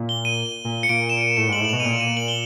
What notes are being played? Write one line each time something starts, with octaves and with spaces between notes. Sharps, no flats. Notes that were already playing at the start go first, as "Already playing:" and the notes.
Already playing: A#2
G7
D#7
A#2
C#7
A#2 D7
E7
D#7
A2 E7
G#2 F#7
A2 F#7
B2 F7
D#7
A#2 D7
D#7
F#7
G7